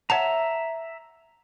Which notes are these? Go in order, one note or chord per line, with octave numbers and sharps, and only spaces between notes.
C#5 E5 F#5 A5 A#5